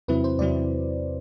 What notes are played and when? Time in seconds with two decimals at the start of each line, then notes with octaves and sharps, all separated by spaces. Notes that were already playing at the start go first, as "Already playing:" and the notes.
0.08 E2 C3 F#3 C4 E4 B4
0.24 C5
0.38 E2 C3 F#3 C4 E4 D5